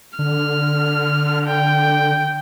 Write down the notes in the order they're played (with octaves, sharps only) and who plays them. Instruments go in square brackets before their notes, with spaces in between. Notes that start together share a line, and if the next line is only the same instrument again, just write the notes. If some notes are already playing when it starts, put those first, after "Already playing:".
[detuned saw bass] D3 [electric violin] F6
[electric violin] G5